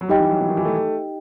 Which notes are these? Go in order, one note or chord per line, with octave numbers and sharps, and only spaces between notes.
F#3
G3 D#4 G4 D#5 G5
E3
F#3
E3
D#3
E3
A3